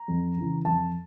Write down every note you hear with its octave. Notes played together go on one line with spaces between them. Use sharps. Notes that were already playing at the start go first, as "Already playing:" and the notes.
Already playing: A#5
F2
C#3 E3
F2 A5